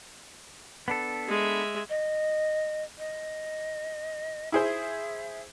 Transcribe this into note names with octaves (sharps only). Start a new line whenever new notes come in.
B3 D4 A4
G#3 E5
D#5
D#5
E4 G#4 C5 E5